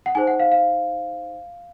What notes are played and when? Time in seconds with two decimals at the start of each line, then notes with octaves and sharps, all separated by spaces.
0.06 F#5
0.15 D#4 G#4 C5 G#5
0.27 F#5
0.40 F5
0.52 F5